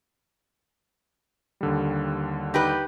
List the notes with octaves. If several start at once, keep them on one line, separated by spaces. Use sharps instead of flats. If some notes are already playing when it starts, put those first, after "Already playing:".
D#2 D3 G3
D#4 G4 B4